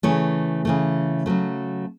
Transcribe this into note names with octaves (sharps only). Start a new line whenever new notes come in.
C#3 E3 A3 C#5
C#3 E3 A3
C#3 F#3 A3